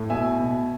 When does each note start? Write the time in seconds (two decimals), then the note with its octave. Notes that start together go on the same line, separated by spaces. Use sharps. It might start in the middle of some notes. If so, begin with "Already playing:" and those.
Already playing: A2
0.10 B2 E5 G#5
0.40 B2